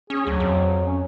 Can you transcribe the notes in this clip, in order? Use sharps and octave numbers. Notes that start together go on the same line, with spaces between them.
C#4 G#4
D2 F#3
F2
C#4